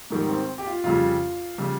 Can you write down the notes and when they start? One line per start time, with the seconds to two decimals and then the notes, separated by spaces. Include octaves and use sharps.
0.10 G#2 D#3 G3
0.29 C4
0.58 G4
0.66 F4
0.84 F2 C#3 G3 F4
1.58 C#3 G3